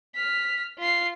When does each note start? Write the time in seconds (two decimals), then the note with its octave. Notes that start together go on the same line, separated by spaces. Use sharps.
0.15 F6 B6
0.79 F4 C7